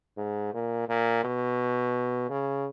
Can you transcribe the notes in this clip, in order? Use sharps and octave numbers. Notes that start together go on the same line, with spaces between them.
G#2
A#2
A#2
B2
C#3